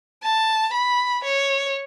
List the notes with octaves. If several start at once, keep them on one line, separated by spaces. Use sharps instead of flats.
A5
B5
C#5